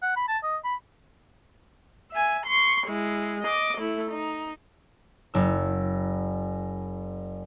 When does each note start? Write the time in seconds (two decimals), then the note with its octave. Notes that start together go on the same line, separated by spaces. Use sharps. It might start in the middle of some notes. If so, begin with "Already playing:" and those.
0.03 F#5
0.16 B5
0.29 A5
0.44 D#5
0.64 B5
2.12 E5 G#5
2.47 C6 C#6
2.87 G#3 E4
3.44 D#5 D6
3.78 A3 E4
4.12 D#4
5.34 F#1 E6